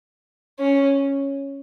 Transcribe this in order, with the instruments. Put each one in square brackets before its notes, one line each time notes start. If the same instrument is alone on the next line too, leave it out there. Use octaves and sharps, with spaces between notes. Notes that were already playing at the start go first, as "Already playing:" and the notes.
[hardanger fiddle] C#4